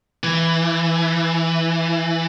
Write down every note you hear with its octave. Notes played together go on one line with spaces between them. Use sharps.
E3